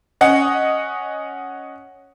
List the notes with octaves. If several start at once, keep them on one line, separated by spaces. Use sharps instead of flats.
C#4 D#5 F#5